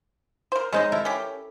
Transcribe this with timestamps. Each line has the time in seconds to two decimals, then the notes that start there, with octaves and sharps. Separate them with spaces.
0.52 A#4 C5
0.73 G#3 C#4 D#4 C5 D#5
0.92 E4 A4 A#4
1.05 C#4 G4